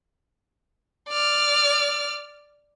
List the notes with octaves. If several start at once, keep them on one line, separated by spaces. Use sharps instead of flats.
D5 F6